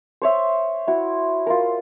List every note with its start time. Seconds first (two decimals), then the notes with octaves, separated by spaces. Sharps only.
0.22 C5 C#5 E5
0.87 E4 F#4
1.47 F4 A#4